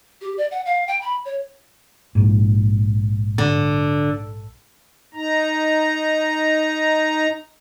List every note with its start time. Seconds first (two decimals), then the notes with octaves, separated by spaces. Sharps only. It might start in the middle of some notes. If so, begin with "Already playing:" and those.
0.21 G4
0.38 D5
0.51 F#5
0.66 F5
0.87 G5
1.01 B5
1.25 C#5
2.15 A#1 G#2
3.38 D3
5.15 D#4 A#5